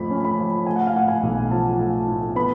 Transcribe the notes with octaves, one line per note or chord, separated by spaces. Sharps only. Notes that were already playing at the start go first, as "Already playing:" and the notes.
Already playing: F2 F3 A3 B5
C#4
B5
F3
A3 G#5
F#5
F5
A2 F#5
G#5
B1
F3 A5
A3
A2
B3 B5